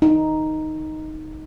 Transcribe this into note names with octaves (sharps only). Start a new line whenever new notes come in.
D#4